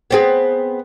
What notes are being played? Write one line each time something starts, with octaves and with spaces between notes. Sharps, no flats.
B3 C4 G#4